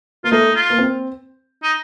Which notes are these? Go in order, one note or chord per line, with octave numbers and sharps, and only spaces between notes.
A#3 F4
A3 D#4
F4
A#3
C4
D#4